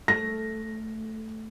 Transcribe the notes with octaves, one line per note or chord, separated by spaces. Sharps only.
A3 A#6